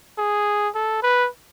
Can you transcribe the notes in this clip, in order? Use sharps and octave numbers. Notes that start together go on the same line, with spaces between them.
G#4
A4
B4